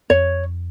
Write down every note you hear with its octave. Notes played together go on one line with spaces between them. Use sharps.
F2 C#5